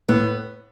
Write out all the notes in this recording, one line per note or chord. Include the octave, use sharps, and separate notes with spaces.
A2 B3